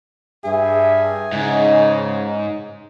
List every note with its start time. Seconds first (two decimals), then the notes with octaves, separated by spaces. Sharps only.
0.44 G2 G#4 E5
1.32 G#2 C#3 D#4